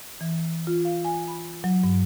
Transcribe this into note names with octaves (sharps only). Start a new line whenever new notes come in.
E3
F4
F5
G#5
B5
F#3
G2